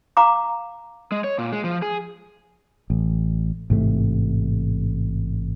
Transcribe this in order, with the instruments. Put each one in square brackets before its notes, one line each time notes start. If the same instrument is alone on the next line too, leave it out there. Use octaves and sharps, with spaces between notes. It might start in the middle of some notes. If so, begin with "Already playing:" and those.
[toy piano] F5 A#5 D6
[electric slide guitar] G#3
C#5
A#2
G#3
F3
G#4
[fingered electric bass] A1
A1 G#2 C3 A3